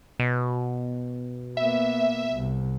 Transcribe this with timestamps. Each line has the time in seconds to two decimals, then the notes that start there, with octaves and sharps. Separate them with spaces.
0.20 B2
1.57 A#3 B3 E5
2.34 C2